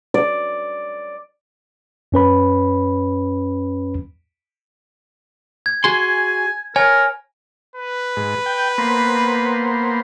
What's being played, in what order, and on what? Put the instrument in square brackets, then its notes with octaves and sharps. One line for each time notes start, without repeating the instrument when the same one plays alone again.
[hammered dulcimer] D5
[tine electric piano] F#2 C#4 B4 B5
[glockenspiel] G#6
[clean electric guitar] F#4 G#4 C6 [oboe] G#5
[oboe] A#4 [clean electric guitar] C#5 [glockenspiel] G#5
[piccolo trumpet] B4
[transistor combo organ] G#2
G5
A#3 B3 C5